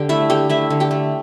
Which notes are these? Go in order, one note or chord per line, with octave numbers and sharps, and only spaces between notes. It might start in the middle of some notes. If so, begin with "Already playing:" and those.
Already playing: D3 G4 G5
A3 E4 E5
D3 G4 G5
A3 E4 E5
D3
G4 G5
A3